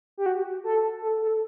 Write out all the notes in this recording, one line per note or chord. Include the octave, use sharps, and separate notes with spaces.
G4
F#4
A4
A4
A4